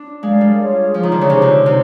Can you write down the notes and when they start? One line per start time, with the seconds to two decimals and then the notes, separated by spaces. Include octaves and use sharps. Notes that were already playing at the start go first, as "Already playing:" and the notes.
Already playing: D4
0.22 G#3 A#4 D5 F5
0.41 G3
0.59 F4 G#4 C#5
0.94 F3 F4 G#4 C#5
1.03 D#3
1.12 D3
1.21 C#3
1.30 C3 D#4 G4 C5
1.42 D3
1.66 C3 D#4 G4 C5